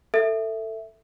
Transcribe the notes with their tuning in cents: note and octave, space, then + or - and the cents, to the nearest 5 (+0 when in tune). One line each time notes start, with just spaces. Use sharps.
A4 +20 E5 +0